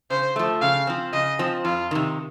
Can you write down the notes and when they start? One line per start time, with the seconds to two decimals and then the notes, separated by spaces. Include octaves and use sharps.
0.10 C#3 C5
0.36 F3 A3
0.61 C#3 F5
0.87 F3 C4
1.13 C#3 D#5
1.39 F3 C4
1.65 F2 F4
1.91 C3 D#3